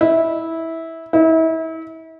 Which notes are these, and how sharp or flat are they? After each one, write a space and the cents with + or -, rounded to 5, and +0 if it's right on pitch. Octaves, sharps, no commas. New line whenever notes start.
E4 -15
E4 -35